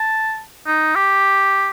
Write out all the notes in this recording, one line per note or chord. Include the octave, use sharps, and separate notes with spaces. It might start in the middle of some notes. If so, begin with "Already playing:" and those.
Already playing: A5
D#4
G4